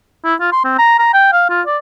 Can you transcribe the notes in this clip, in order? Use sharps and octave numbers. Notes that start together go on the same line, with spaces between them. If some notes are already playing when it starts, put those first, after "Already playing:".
E4
F4
C6
C4
A#5
A#5
G5
F5
F4
D5